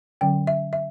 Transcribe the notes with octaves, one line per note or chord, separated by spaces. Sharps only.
D3 F#3 C#4 G5
E5
E5